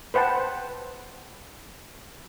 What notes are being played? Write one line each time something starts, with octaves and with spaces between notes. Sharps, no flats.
B4 C5 F#5 G5 A5